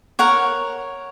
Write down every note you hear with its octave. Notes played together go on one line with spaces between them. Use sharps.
A#4 C#5 F#5